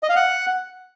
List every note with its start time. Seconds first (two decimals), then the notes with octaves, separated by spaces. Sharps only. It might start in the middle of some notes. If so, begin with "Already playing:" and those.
0.03 D#5
0.09 F5
0.16 F#5